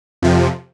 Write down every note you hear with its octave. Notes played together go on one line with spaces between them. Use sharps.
F2 C3 F3